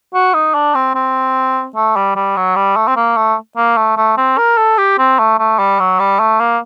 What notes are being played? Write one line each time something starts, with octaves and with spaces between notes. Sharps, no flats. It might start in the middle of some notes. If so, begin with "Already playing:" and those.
F#4
D#4
D4
C4
C4
A3
G3
G3
F#3
G3
A3
C4
A#3
A3
A#3
A3
A3
C4
A#4
A4
G4
C4
A3
A3
G3
F#3
G3
A3
A#3